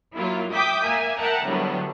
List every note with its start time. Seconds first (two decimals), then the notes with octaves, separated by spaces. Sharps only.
0.15 F#3 A#3 E4 F4
0.53 E5 G5 D6 D#6 G6 B6
0.82 A#3 E5 G#5
1.18 A#4 E5 F#5 G5 A5 A#5
1.47 A2 D3 F#3 G3 B3